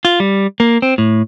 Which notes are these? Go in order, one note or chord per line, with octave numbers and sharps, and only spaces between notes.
F4
G3
A#3
C4
A2